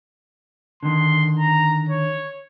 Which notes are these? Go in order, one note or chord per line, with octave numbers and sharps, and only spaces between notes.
D3 D#3 C6
A#5
C#5